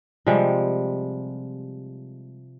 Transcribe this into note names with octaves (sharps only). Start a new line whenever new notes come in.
C3 F3 G3 G#3